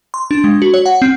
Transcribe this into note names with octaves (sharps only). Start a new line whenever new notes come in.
C6
D4
G#3
F#4
C#5
F#5
C4